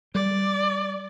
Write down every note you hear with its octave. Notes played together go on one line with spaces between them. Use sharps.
G3 D5